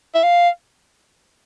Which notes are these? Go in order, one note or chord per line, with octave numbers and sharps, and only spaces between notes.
E5
F5